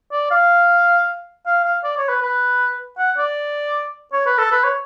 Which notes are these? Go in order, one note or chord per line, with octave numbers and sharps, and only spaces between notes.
D5
F5
F5
F5
D5
C#5
B4
B4
F#5
D5
C#5
B4
A4
B4
C#5